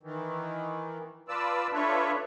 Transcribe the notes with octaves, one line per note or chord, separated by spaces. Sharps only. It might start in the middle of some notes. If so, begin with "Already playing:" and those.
D#3 E3
F4 B4 D5 A5 E6
D4 F4 A4 B4 C#5 E5